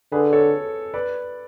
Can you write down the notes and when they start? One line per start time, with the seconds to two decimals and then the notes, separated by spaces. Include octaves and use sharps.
0.12 D3 G#4 B4
0.33 A4 C#5
0.94 B4 D5